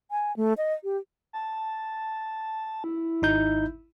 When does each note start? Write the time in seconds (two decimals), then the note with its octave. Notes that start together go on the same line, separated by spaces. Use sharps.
0.11 G#5
0.37 A3
0.58 D#5
0.84 G4
1.33 A5
2.84 E4
3.22 G#1 D#4 G6